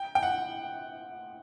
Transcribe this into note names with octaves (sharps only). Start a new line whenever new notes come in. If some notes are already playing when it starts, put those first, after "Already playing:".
Already playing: G5
G5
F#5